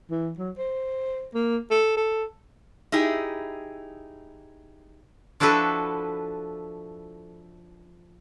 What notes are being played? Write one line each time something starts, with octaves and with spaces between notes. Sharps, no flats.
E3
F#3
C5
A#3
A4
A4
D#4 E4 G4 G#4
F3 D4 E4 F#4 A4 B4